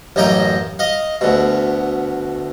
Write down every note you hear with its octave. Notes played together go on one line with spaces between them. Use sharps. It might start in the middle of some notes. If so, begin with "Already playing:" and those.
A1 F#2 A#3 D#5 G5 A#5
D#5 F5
D2 B2